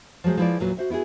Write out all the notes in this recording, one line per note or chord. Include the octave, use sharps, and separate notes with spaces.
F3 F#3 G#3 C5
F3 G#3 E4 F4 B4 D5
E2 A#2 F#3 B4
F#4 C5 E5
B3 E4 F#4 G#4